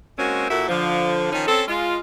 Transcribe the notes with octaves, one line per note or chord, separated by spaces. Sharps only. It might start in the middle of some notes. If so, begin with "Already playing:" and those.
G#3 A#3 C4 C#4 F#4
A#2 A#3 E4 F#4 A4
D3 F3
D#3 F3 C#4 D#4
C4 C#4 A4
G#3 F4